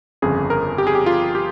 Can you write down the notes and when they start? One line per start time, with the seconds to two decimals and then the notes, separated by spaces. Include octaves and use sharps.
0.22 G1 F2 C#3 G#4
0.50 A#4
0.78 G4
0.87 G#4
0.95 G4
1.06 F4
1.35 G4